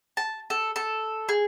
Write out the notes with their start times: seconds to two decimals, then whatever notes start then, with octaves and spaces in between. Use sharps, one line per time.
0.17 A5
0.50 A4
0.76 A4
1.29 G#4